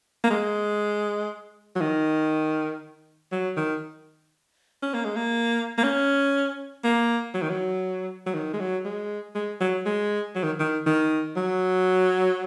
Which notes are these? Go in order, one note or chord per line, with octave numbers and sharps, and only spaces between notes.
A#3
G#3
F#3
D#3
F#3
D#3
C#4
A#3
G#3
A#3
A#3
C#4
A#3
F#3
D#3
F#3
F#3
D#3
G#3
F#3
G#3
G#3
F#3
G#3
F#3
D#3
D#3
D#3
F#3